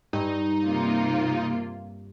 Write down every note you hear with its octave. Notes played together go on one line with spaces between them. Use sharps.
G2 D#4
C3 A#3 F4